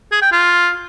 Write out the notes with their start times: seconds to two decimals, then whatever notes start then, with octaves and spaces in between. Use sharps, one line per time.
0.12 G#4
0.22 G5
0.32 F4